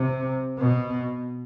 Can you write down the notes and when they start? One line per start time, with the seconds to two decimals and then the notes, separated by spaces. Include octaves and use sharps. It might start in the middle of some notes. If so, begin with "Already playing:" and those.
Already playing: C3
0.59 B2